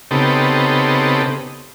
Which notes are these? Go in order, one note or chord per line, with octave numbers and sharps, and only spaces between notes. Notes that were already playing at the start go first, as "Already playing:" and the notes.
C#3 B3 C4 D#4 G4 A4